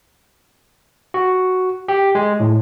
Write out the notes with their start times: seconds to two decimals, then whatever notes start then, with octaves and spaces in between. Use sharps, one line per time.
1.14 F#4
1.88 G4
2.15 G#3
2.40 A2